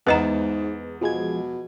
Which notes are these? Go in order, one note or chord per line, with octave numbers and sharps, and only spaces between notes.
E2 G#2 G#3 B3 B4 D#5 A#5
B2 F3 G#3 G#6